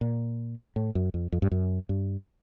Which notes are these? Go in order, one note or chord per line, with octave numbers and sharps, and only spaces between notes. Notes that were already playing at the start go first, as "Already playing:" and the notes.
A#2
A2
F#2
F2
F2
G2
F#2
G2